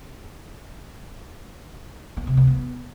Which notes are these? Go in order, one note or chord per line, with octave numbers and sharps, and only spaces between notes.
B3
C3
B3
B3